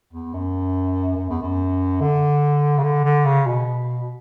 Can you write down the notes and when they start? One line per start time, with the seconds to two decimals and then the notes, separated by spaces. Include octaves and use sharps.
0.13 E2
0.34 F#2
1.17 F#2
1.30 E2
1.42 F#2
2.01 D3
2.78 C#3
2.83 D3
3.05 D3
3.26 C#3
3.46 B2